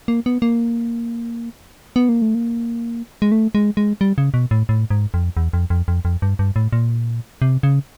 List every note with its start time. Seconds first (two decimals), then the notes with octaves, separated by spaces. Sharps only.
0.08 A#3
0.26 B3
0.42 A#3
1.96 B3
2.09 A#3
2.22 A3
2.35 A#3
3.22 G#3
3.32 A3
3.55 G#3
3.77 G#3
4.01 G3
4.18 C#3
4.34 B2
4.51 A2
4.69 A2
4.90 G#2
5.14 F2
5.37 E2
5.53 F2
5.70 F2
5.88 F2
6.05 F2
6.22 G2
6.39 G2
6.56 A2
6.73 A#2
7.42 C3
7.63 C#3